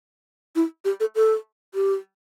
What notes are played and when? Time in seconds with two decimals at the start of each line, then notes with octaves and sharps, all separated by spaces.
0.56 E4
0.85 G4
1.00 A4
1.15 A4
1.75 G4